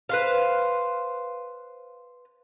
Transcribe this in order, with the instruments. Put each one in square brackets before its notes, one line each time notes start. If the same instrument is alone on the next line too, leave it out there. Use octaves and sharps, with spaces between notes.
[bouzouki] B4 C5 F5